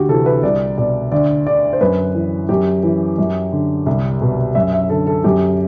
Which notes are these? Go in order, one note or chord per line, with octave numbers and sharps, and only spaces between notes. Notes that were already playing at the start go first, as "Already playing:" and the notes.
Already playing: D2 F#4 G4
C3 E3 A4
B4
C2 D5
B2 D5
D2 D5
D3 D5
C5
F#2 B4
E3
F#2 G4
E3
F#2
D3
C2
B2
F#2 E5
E5
D3 A4
A4
F#2 G4